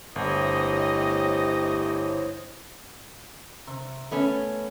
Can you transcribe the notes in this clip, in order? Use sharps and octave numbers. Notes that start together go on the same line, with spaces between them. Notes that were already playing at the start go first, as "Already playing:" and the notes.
G1 A3 B3 E4 G4 C5 C#5 D#5
C3
A3 B3 C#4